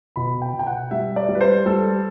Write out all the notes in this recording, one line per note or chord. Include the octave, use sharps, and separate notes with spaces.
B2 B5
G5
B2
G5
F#5
G3 E5
D5
G3
B4
C5
G3 A4